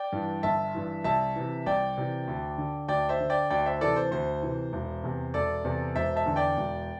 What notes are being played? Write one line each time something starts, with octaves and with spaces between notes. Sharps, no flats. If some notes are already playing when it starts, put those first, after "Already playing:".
Already playing: D5 G5
G2 E3
G1 E5 A5
G2 E3
C2 E5 A5
C3 E3
C2 D5 G5
C3 E3
D2
D3
D2 D5 G5
C5 E5
D3
D5 G5
D2 D5 G5
C5 E5
C3 E3 A4 D5
C5
D2 C5
C3 E3
E1
E2 C3
E1 A4 D5
E2 C3
E1 C5 E5
E5 A5
E2 D3
D5 G5
E1